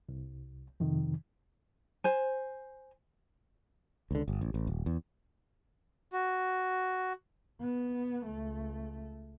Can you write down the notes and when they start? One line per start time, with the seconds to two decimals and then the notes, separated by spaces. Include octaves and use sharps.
0.09 C2
0.80 F2 C3 D#3
2.04 C5 G#5
4.11 C#2 D3
4.28 G1
4.41 A1
4.54 A1
4.67 D#1
4.86 E2
6.12 F#4
7.61 B3
8.25 C#2 A3